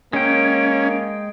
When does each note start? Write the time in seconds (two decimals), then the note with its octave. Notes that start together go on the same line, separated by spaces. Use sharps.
0.13 G#3 A#3 C#4 G5